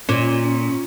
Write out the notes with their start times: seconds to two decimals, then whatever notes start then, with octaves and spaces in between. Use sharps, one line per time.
0.09 A#2 C#4